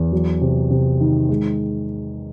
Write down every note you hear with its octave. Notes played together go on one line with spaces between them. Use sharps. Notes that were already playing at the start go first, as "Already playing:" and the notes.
Already playing: E2
F#3
C3
C3
D#3
G#3